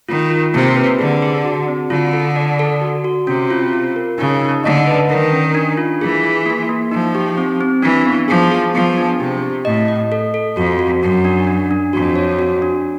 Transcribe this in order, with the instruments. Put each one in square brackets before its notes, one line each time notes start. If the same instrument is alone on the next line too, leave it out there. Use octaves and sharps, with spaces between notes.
[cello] D#3 [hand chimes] F4
[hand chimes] F4
[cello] C3 [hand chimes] A#3
[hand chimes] B4
[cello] D3 [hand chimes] G#4
[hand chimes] G#4
F#4
C4
[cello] D3 [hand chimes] F4
[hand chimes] A4
D5
A4
F#4
F#4
[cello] C3 [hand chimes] C#4
[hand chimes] F4
F4
A#4
[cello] C#3 [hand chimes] D#4
[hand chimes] D#4
[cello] D3 [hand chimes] D#5
[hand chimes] B4
[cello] D#3 [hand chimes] A#4
[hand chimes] C#4
D4
F4
[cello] E3 [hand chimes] G#4
[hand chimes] G#4
A#3
A#3
[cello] F3 [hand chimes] D#4
[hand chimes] G4
C4
C4
[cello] E3 [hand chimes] D4
[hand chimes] B3
[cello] F3 [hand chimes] G#4
[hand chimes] G#4
[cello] F3 [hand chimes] B3
[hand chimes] D4
[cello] C3 [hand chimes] G4
[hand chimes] G4
[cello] A2 [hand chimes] D#5
[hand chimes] D#5
A4
A4
[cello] F2 [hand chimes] F#4
[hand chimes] F#4
[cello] F#2 [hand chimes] F#4
[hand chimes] D4
D4
D4
[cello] F2 [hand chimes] F#4
[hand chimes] C#5
F#4
D4